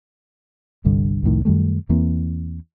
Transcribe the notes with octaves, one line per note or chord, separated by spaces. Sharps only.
G1 C2 G2 D3
C2 F2 A2 D#3
F#2 D#3 G3 A3
E2 E3 A#3 C4